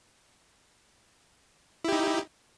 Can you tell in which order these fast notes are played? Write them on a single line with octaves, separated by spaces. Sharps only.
E4 G4 D#4